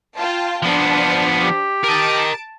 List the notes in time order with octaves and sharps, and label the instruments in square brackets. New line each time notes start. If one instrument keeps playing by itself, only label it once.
[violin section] F4 G5 A5
[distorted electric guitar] F3 B3 [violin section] D4 C5
[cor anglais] G4
[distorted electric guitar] A#4 D#5 [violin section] A5 D7